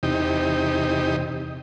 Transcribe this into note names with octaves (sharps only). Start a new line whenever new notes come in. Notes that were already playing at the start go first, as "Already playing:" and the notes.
E2 C3 D#4 G4